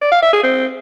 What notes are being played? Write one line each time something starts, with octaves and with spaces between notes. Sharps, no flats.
D5
F5
E5
G#4
C4